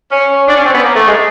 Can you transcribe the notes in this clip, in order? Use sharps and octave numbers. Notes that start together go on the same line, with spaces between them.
C#4
D4
C#4
C4
B3
A#3
A3
G#3